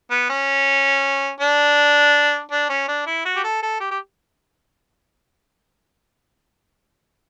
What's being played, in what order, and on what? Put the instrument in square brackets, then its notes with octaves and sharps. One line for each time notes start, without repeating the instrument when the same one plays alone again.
[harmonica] B3
C#4
D4
D4
C#4
D4
E4
F#4
G4
A4
A4
G4
G4